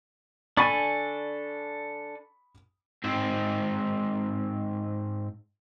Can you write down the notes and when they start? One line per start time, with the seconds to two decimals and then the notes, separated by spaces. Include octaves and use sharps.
0.57 D4 A4 G#5 B5 C#6 A6
3.04 G#2 C4